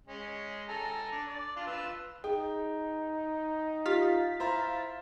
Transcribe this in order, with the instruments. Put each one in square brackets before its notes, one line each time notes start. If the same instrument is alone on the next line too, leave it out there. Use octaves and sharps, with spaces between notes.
[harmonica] G#3 C#4
A4 G#5 A#5
D4
D5
D4 F4
F4 B4 E6
[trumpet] D#4 [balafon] G#4 [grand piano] G5
[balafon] F4 G4 [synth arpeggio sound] F5 A6 B6
[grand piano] E4 C5 A#5